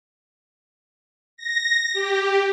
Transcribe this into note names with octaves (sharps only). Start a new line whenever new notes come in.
A#6
G4